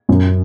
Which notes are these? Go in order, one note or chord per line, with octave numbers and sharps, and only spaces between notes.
F#2